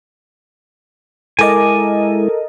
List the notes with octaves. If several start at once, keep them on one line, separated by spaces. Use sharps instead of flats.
G#3 E4 A4 A#4 D#5 G#5 D6